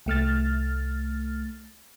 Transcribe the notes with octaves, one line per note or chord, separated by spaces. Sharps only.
C2 A3 F6 A6